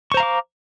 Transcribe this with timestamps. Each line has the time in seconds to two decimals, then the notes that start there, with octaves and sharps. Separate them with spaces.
0.12 C#6
0.14 C5
0.17 A#5
0.20 F5
0.23 D6